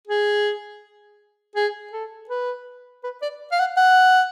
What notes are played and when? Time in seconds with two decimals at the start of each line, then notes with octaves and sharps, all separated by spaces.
0.07 G#4
1.56 G#4
1.93 A4
2.29 B4
3.04 B4
3.22 D5
3.51 F5
3.59 F#5
3.77 F#5